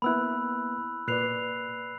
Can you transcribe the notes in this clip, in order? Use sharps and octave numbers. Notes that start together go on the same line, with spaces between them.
A#3 B3 E4 B5 E6 F#6
A#2 B4 D5 F#6 C7 F7